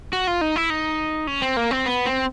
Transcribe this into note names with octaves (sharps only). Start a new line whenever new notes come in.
F#4
F4
D#4
E4
D#4
C#4
C4
A#3
C4
B3
C4